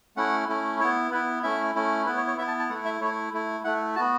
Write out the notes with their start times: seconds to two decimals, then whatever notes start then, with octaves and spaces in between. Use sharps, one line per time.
0.17 A3 C#4 E4 F#5
0.49 A3 C#4 E4
0.80 B3 E4 C#5
1.11 B3 E4 B4
1.43 A3 C#4 E4 E5
1.75 A3 C#4 E4
2.06 B3 E4 B4
2.17 C#5
2.27 C#5
2.38 B3 E5
2.41 E4
2.48 A5
2.59 A5
2.70 A3 F#5
2.74 E4
2.85 E5
3.01 A3 E4 C#5
3.33 A3 E4
3.64 A3 E4 F#5
3.96 B3 F#4 A5